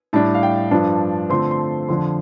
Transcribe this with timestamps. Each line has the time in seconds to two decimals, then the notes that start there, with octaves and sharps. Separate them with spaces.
0.13 A2 G3 D4 A5
0.35 F5
0.43 G5
0.71 G2 F3 D4 A5
1.30 D3 F3 A3 C4 C6
1.51 C6
1.59 A5
1.88 F2 D3 F3 C6